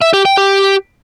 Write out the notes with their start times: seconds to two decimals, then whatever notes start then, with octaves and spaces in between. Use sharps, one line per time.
0.01 E5
0.13 G4
0.25 G5
0.37 G4